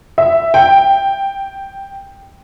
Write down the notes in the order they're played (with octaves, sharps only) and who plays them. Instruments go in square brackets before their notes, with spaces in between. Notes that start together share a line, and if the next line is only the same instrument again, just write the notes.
[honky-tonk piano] E5
G5